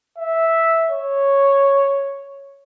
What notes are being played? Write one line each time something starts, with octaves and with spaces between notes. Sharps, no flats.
E5
C#5